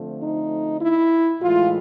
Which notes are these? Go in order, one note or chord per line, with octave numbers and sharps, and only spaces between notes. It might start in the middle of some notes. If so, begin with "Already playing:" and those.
Already playing: D3 F3 A3 C4
D#4
E4
A2 E3 G#3 F4